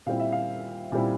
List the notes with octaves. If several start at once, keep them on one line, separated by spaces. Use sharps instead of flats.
A#2 G3 C4 E4 F5
E5
F5
A#2 G3 C4 E4